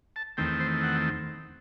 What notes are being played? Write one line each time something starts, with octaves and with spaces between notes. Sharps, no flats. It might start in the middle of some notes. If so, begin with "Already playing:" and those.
A5
E2 D#3 A3 C4 G5
C5
F#5